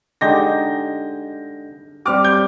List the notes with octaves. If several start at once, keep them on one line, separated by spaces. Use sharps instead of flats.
D3 G#3 D#4 G4 G6 A#6
G3 C4 G4 D6 F6
G6